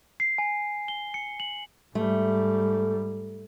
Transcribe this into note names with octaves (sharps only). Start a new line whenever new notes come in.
C7
G#5
G7
C#7
F#7
G#2 G3 A3